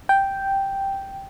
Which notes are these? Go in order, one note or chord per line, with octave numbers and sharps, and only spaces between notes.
G5